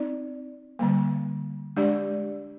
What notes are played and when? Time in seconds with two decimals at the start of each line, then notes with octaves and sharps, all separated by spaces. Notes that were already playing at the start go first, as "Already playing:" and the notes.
Already playing: C4 D#4 D5
0.79 D3 G3 A#3
1.77 G#3 D4 G4 D5